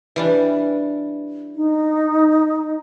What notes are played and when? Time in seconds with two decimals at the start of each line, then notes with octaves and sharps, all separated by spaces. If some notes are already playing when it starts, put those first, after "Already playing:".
0.16 E3 G3 D4
1.55 D#4